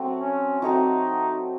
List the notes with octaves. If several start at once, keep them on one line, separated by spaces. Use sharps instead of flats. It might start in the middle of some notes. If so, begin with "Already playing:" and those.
Already playing: F#3 A3 C4 F#4
C#4
F#3 A3 C4 D#4 F#4